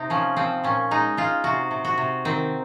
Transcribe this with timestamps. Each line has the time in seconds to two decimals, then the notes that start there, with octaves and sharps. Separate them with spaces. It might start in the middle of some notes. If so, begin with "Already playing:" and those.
Already playing: C3 D#4
0.10 F3 C#4
0.36 F3 C4
0.64 A#2 C#4
0.91 G#3 D#4
1.17 G#3 F4
1.44 C3 F#4
1.71 C3
1.85 F#4
1.98 C3
2.25 D#3 C4